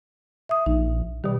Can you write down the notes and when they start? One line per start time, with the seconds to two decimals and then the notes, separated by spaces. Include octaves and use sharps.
0.49 E5 D#6
0.66 A#1 D#4
1.24 B2 D#3 G3